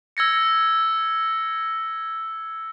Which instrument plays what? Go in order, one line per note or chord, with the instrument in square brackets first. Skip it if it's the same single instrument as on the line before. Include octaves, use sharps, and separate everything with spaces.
[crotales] E6 G#6 A#6 C#7